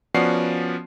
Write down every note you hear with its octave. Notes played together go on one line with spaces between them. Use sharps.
F3 B3 C#4 F#4 D5 C7